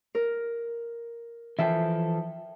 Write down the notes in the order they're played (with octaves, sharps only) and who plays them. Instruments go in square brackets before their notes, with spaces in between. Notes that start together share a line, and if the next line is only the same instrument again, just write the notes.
[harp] A#4
[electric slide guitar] E3 F3 A4 [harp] E5 G5